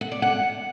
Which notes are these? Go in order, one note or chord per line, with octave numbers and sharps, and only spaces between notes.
F#5
D5
F#5